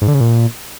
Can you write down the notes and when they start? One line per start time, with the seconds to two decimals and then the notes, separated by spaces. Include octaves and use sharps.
0.02 G#2
0.08 D3
0.14 C#3
0.21 A#2